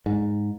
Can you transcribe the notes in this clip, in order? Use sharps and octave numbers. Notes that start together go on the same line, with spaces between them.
G#2